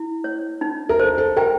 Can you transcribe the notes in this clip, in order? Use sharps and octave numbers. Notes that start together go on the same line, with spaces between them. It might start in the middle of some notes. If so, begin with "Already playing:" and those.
Already playing: E4
C#5
D#4
A#4
A4 C5
A4
A#4 G5